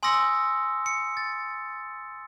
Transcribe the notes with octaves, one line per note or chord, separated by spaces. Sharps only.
G#5 C6 D#6 E6 A#6 C#7
C#7
A6